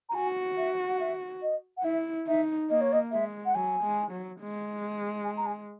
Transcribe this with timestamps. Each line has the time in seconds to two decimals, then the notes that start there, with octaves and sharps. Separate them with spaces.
0.09 A#5
0.14 F#4 G#5
0.57 E5
0.88 F#5
0.99 E5
1.42 D#5
1.77 F#5
1.84 E4 E5
2.27 D#4 E5
2.69 A#3 D#5
2.81 C#5
2.92 D#5
3.11 G#3 E5
3.45 F#5
3.54 F#3 G#5
3.83 G#3
4.11 F#3
4.40 G#3
5.24 G#5
5.37 A#5
5.46 G#5